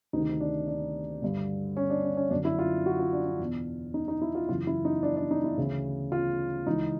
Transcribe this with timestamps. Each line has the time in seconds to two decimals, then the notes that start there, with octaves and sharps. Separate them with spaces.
0.13 D2 C3 D#3 D#4
0.40 D4
0.68 D4
1.22 G2 D3
1.77 C#4
1.90 D4
2.04 D4
2.17 C#4
2.31 F#2 D4
2.35 D3
2.45 E4
2.59 F4
2.86 F#4
2.99 F4
3.13 D4
3.26 D4
3.40 E2 B2
3.94 D#4
4.08 D#4
4.21 E4
4.35 F4
4.49 F#2 C#3 E3 F4
4.67 E4
4.85 D#4
5.03 D4
5.17 D4
5.31 D#4
5.44 E4
5.58 D2 C#3 E3
6.12 F4
6.66 C#2 C#3 E3 D#4